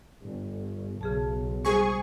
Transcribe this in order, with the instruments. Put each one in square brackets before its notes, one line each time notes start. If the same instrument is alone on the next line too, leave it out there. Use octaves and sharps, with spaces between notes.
[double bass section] G1
[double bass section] B1 [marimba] C#3 G#4 A5
[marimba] G3 G#3 C5 [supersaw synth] G#4 G#5 C#6